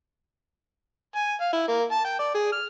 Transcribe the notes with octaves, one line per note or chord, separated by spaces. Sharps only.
G#5
F5
E4
A#3
A5
G5
D5
G#4
F6